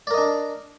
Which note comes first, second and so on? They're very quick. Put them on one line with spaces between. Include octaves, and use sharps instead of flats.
D5 A#4 D#5 D4